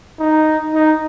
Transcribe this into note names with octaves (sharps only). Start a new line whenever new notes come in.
D#4
D#4